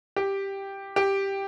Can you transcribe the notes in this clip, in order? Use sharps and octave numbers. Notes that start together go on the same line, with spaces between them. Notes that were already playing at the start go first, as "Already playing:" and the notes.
G4
G4